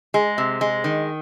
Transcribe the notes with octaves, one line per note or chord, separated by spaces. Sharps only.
G#3
C3
G#3
D#3